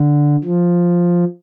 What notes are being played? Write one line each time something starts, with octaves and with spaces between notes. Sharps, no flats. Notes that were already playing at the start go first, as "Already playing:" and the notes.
Already playing: D3
F3